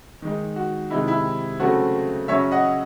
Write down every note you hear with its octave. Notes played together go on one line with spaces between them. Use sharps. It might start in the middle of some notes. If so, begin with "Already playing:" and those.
D#3 G#3 D#4
F#4
C3 D#3 G#3 D#4 E4
E4
C#3 F#3 A3 C4 F#4
C#3 F#3 C#4 C#5 E5
D#5 F#5